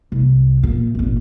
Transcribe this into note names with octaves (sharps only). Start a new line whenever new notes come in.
C2
A#2
G#1 A#2